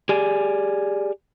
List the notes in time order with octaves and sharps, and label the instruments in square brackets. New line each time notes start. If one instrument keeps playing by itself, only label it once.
[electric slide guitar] G4 G#4 D5 G#5